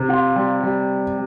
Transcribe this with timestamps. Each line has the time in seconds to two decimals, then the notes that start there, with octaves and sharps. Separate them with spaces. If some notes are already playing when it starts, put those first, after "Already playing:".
Already playing: C3
0.09 F4
0.36 G3
0.64 G3